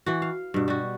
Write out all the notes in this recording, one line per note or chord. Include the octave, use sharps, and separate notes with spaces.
E3 F#4
F5
G2 B2
G3 F#4